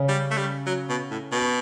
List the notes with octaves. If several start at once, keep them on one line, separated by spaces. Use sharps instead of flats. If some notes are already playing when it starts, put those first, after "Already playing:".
Already playing: C#3 C#4
G3
A3
G3
F#3
B2
A2
B2